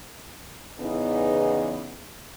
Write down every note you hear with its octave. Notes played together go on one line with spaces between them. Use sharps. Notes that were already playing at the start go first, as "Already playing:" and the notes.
E2 C#3 E3 B3 D#4 G#4